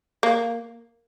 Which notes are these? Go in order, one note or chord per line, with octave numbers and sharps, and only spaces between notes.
A#3